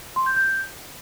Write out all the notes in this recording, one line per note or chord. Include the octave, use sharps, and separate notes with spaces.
C6
G6
G6